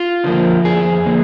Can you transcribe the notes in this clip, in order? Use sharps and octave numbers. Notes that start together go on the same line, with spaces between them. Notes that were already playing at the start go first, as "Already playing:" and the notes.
Already playing: F4
D3 F3 A#3
F2 G#4
D3 F3 A#3